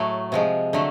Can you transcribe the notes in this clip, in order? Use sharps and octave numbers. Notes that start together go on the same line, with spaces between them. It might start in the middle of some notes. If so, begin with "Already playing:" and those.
Already playing: A2 F#3 A3
C3 F3 G#3
D3 F#3 A3